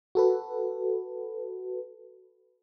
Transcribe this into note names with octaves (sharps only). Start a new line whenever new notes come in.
F#4 A4 B4